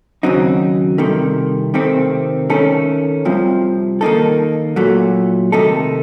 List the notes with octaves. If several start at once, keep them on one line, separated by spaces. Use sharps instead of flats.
D#2 C#3 F#3 C4 D#4
C2 C3 D#3 A3
C3 D#3 A3 C4
D#3 A3 C#4 A4
C2 C3 F3
D#3 A#3 D#4 A4
A#2 F#3 A3
C3 D#3 A3 D#4 A4